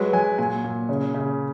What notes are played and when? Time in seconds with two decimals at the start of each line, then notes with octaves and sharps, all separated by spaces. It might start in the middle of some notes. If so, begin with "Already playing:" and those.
Already playing: F#3 G#3 B4
0.13 F#3 G#5
0.38 A#2 G#5
0.64 A#2
0.89 C#3
1.14 C#3